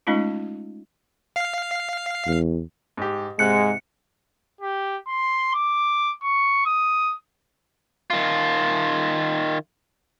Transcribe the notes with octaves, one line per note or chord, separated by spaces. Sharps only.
G#3 A3 C#4 D#4 F4
F5 C7
E2
G#2 G4
G#2 C3 G#3 F#6 C#7
G4
C6
D6
C#6
D#6
D#3 F4